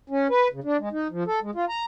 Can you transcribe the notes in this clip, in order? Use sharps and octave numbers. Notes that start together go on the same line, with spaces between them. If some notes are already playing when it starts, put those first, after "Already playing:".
C#4
B4
C#3
D4
G#3
D#4
F3
A4
G#3
F4
A#5